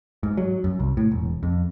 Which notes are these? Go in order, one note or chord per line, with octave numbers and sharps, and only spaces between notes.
G#2
F#3
F#2
C2
A2
E1
F2